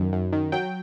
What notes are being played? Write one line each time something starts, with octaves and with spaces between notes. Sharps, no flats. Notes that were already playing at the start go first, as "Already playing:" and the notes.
Already playing: F#2 D#3
F#2
D#3
F#3 G5